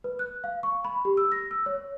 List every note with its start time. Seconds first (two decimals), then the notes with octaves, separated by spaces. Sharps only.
0.04 B4
0.19 F#6
0.44 F5
0.63 C#6
0.85 B5
1.05 G4
1.17 E6
1.32 A#6
1.51 E6
1.66 C#5